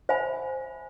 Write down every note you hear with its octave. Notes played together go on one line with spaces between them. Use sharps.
C5 E5 G#5 B5